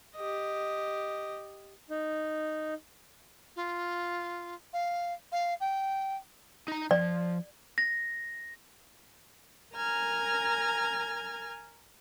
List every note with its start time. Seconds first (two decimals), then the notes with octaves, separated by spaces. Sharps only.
0.15 G4 D#5
1.90 D#4
3.56 F4
4.73 F5
5.32 F5
5.60 G5
6.68 D#4 A#5
6.91 F3 D5
7.78 A#6
9.75 A#4 G#5 A#5 F6 G#6